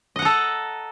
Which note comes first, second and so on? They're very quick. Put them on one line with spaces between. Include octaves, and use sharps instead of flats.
D#5 F#5 A#5 A4